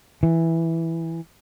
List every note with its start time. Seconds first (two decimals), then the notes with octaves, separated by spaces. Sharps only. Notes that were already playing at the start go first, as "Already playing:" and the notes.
0.23 E3